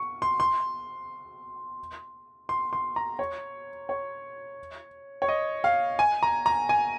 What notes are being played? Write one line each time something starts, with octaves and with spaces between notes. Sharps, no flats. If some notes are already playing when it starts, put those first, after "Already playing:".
Already playing: C#6
C6
C6
C6
C6
A#5
C#5
C#5
C#5
D#5
F5
G#5
A#5
A#5
G#5